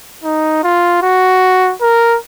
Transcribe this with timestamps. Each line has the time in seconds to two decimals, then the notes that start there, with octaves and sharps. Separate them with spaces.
0.23 D#4
0.63 F4
1.02 F#4
1.82 A#4